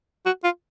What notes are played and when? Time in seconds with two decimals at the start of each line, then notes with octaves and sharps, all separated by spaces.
0.26 F#4
0.44 F4